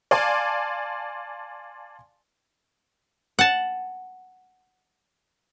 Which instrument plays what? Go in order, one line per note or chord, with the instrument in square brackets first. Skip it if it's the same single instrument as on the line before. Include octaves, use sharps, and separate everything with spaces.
[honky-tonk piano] D5 F5 G#5 A5 C6 D6
[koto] F#5 A5